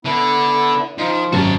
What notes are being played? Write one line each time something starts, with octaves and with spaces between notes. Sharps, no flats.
D3 B3 E4
D#3 F3 F4
G#1 F#2 F#4 A5